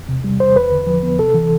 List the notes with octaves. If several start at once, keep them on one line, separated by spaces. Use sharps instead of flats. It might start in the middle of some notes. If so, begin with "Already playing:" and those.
Already playing: E2
C3
G3
E2 C5
E2 B4
D3
F3
B3
C3 A4
E3